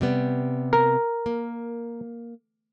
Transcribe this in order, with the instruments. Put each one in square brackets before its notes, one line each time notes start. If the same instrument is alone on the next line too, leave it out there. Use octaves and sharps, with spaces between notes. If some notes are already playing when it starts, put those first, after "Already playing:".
[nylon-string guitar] C3 G3 B3
[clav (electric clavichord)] A#4
[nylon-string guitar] A#3